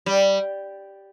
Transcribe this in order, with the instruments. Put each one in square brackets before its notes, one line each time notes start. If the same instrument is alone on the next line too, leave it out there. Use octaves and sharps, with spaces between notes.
[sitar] G3